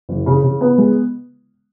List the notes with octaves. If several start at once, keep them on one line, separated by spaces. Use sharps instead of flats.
F#1
C#3
C#3
B3
G#3